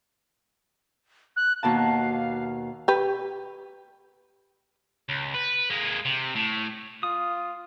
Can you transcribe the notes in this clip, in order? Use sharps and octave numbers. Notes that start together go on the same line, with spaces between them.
F#6
D#2 B2 F5 A5
G4 B4
C#2
B4
G#3 A#3
C3
A2
F4 D#6